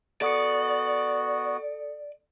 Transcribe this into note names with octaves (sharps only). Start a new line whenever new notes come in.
B3 F#4 A4 D5 D#6 C#7